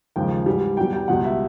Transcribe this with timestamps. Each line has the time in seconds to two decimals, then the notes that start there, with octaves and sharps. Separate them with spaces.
0.16 D#2 C#3 F3 G#3 G5
0.46 G#2 E3 G3
0.77 E2 B2 G3 G5
0.93 G5
1.08 C#2 B2 G3 F#5
1.24 E5